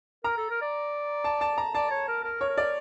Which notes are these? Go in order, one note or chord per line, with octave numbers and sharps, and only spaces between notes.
A#4 A#5
A4
A#4
D5
A5
A5
A#5
D5 A5
C#5
A#4
A#4
C#5
A#4
D5